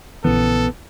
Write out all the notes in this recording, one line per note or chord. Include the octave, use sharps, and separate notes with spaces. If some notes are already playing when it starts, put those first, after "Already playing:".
A#1 C#3 E3 B3 A4